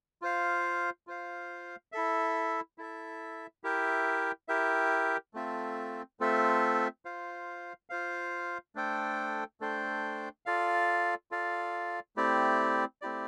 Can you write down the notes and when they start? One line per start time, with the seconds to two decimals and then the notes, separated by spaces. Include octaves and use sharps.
0.22 F4 C5 F5
1.07 F4 C5 F5
1.92 E4 A4 E5
2.78 E4 A4 E5
3.64 E4 G4 A#4 E5 G5
4.48 E4 G4 A#4 E5 G5
5.34 A3 C4 F4 A4 E5
6.20 A3 C4 F4 A4 E5
7.05 F4 C5 F5
7.90 F4 C5 F5
8.75 A3 D4 A4 C5 G5
9.60 A3 D4 A4 C5 G5
10.46 F4 A4 D5 F5
11.31 F4 A4 D5 F5
12.16 A3 C4 E4 G4 D5
13.02 A3 C4 E4 G4 D5